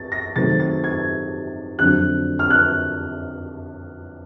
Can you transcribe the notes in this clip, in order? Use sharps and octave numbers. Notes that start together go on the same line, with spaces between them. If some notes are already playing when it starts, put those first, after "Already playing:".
Already playing: C4 A6
A#6
C3 D#3 F#3 A3 C4 A6
A6
G#6
F2 D3 F#3 F#6
F6
F#6